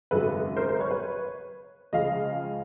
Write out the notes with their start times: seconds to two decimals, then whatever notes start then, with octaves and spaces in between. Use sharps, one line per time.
0.11 G#1 F#2 C#3 F#3 A4 B4
0.56 A#4 C5
0.68 A#4 C5
0.79 B4 C#5
0.91 B4 C#5
1.93 C#2 C#3 F3 G#3 D#5 F5